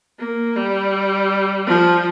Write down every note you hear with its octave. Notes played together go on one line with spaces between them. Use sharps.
A#3
G3
F3